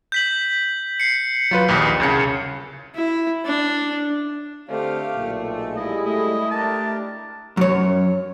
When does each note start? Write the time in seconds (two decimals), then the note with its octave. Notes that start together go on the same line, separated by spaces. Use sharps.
0.12 G6 B6 F#7
1.00 C7 C#7
1.51 F#3 F4 B4
1.68 A#1 D#2
2.00 C2 C#3 C#7
2.95 E4
3.45 D4
4.69 D3 A3 C4 G4 C5 F5
5.16 B1 A#2
5.48 G#3 A4
5.76 G3 G#3 E4 D#5
6.05 A3 D#5
6.51 D4 G4 A#4 A5
7.57 F#2 C#5